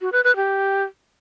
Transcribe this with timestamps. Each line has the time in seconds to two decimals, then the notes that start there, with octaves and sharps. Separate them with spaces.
0.01 F#4
0.12 B4
0.24 B4
0.36 G4